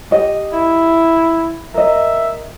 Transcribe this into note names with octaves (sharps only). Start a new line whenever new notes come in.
G4 D#5
E4
A#4 D#5 E5